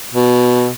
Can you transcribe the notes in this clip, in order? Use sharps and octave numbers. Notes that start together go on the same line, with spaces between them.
B2